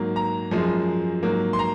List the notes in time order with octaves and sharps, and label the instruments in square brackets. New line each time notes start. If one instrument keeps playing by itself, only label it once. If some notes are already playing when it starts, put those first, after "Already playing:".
Already playing: [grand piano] G#2 F#3 A#3
A#5
F#2 F3 G#3
G#2 F#3 A#3
C6
A#5